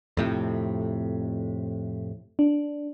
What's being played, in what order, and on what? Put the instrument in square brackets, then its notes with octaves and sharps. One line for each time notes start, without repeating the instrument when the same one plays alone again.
[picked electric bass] F2 A2 C3
[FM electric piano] D4